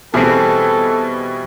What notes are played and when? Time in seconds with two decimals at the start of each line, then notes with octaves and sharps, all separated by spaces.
0.14 B2 E3 G3 C4 E4 G#4 A4